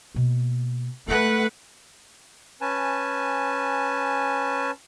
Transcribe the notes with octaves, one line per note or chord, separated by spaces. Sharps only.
B2 A#3
G#3 A3 F4 B4 F#5
C#4 B4 G#5 A5